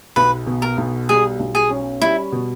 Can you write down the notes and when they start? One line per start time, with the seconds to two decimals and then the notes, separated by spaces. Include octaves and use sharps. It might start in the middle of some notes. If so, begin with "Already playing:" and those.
0.16 B1 B4
0.46 B2
0.62 A#4
0.78 B1
1.09 G3 G#4
1.39 B1
1.55 G#4
1.70 C#4
2.01 G3 E4
2.32 B2